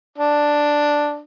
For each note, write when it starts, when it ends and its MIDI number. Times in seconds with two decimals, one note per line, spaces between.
0.18 1.19 62